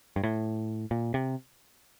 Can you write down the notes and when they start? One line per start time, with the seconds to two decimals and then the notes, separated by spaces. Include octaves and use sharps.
0.16 G2
0.23 A2
0.91 A#2
1.14 C3